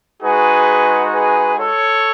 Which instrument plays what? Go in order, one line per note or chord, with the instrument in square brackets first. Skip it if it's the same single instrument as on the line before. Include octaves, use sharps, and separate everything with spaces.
[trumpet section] G#3 D#4 F#4 G#4 B4
G#4 B4
A4 C#5